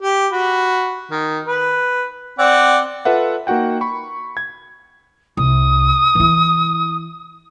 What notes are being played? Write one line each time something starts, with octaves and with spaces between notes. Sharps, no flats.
G4
F#4 B5
D#3
B4
C4 D5 F#5
F4 A4 B4 E5 F#5
A#3 D#4 F#4 F#5 G5
B5 C#6
G#6
C2 D#6
E3 E4